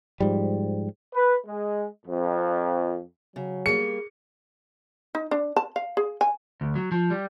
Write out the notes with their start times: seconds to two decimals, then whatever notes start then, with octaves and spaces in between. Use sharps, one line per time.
0.20 G#2 F3 G3
1.14 B4
1.47 G#3
2.06 F2
3.36 C#3 F#3
3.66 G3 A#3 G#4 C#7
5.15 D#4
5.31 D4
5.56 A5
5.76 F5
5.97 G#4
6.21 G#5
6.61 D2
6.76 F#3
6.92 F3
7.10 G3